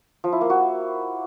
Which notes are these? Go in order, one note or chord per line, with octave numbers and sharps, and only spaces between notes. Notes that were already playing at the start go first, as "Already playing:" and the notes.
F3
E4
A#3
F#4